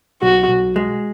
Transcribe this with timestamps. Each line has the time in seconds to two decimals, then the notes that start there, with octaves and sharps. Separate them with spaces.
0.22 B1 F#4
0.49 B1
0.76 G#3